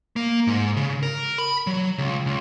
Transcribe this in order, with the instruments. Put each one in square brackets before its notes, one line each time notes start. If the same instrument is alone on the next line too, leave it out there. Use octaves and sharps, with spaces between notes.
[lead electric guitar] A#3
G#2
C#3
A#4
B5
F#3
C#2
C#2